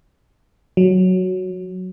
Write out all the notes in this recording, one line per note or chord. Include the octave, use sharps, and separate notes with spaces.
F#3